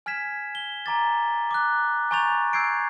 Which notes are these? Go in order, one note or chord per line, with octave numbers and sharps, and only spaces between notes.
G#5 F6 G#6 B6 E7
G7
G#5 A#5 D6 A6
D6 F#6
G#5 A#5 C#6 G6 A6 F7
E6 G6 G#6 C7 D7